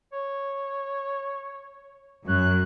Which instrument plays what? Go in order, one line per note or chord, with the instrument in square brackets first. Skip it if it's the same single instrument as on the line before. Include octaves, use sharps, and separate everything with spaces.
[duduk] C#5
[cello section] F#2 [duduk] C#5 [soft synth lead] F#6